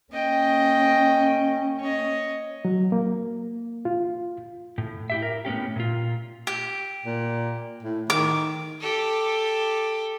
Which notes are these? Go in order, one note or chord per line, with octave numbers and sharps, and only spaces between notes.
A#3 C#4 D#5 G5
C#5 D#5
F#3
A#3
F4
A2
E4 G4 E5
A#4
A2 B3 C#4 G4
A#2 F4
G4
A#2
A2
D#3 D6
G4 A4